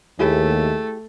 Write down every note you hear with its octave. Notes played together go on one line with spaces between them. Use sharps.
D#2 A3 E4 G4 G#4